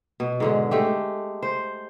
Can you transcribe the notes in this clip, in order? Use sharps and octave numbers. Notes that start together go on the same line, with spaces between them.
B2
G#2 D3 G#3
G#3 A3 G4
C5